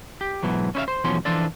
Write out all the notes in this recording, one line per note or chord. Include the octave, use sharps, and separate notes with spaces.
G4
G#2 B2 E3 F#3
C#4 E4 C5 E5 F5
C5
B1 E2 F3 F#3 C#4 C6
E3 F3 D4 F4 A4 D5